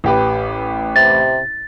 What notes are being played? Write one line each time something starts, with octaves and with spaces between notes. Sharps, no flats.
A1 G4 B4
C3 A6